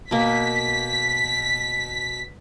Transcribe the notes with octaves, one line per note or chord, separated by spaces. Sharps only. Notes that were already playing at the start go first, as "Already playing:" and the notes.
B2 A#3 B6